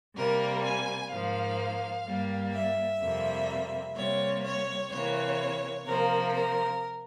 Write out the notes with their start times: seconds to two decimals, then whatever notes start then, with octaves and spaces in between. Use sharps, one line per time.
0.15 C3 G3 A#3 A#4
0.63 G#5
1.10 G#2 F3 A#3 F5
2.05 G2 G3 A#3
2.54 E5
3.01 F2 C3 G3 A#3
3.96 C3 G3 A#3 C#5
4.43 C#5
4.91 C3 E3 A#3 C#5
5.86 C3 F3 A#3 A#4
6.33 A#4